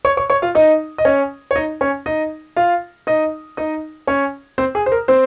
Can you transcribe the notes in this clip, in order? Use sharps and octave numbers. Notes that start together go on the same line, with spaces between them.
C#5 C#6
C#5 C#6
C#5 C#6
F4 F5
D#4 D#5
D#5
C#4 C#5
C#5
D#4 D#5
C#4 C#5
D#4 D#5
F4 F5
D#4 D#5
D#4 D#5
C#4 C#5
C4 C5
G#4
C5
A#4
C4 C5